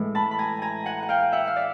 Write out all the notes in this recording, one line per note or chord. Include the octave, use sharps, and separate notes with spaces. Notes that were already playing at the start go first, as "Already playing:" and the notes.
Already playing: A2 E3 G#3
A5 B5
B5
G#5 A#5
G#5 A#5
F#5 G#5
F#5
F5 G5
E5 F#5
F5
D5 E5